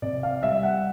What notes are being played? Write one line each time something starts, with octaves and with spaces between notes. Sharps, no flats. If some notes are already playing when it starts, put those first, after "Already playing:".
C3 D5
F5
G3 E5
F#5